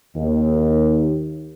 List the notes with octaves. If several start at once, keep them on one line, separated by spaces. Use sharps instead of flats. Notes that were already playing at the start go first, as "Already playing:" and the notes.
D#2